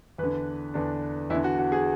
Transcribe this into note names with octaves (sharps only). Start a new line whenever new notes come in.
E2 D3 B4
E2 D3 D4
E2 D3 E4
F#4
F#4
G#4